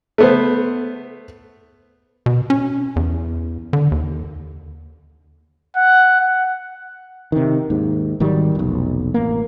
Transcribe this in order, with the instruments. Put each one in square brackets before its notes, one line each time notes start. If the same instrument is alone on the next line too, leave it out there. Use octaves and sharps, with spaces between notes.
[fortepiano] A3 B3 C5
[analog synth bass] B2
C#4
E2
D3
D#2
[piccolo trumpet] F#5
F#5
[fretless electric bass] C3 D#3
D#2 G#2
G#1 D#3 F#3 G3
F1 B1
A1 A#3